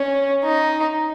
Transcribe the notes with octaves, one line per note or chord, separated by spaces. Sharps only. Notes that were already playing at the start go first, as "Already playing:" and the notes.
Already playing: C#4
D#4